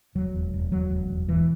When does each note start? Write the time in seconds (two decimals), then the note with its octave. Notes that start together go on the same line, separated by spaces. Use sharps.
0.15 E1 F#3
0.34 E1
0.54 E1
0.72 E1 F#3
0.91 E1
1.10 E1
1.28 E1 E3